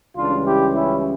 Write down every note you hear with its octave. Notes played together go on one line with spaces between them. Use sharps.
C#2 C#3 E3 G3 D4 F4
E4 G4
C#4 E4